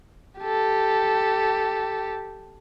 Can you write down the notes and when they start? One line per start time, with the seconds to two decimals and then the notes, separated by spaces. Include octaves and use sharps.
0.41 G4 A4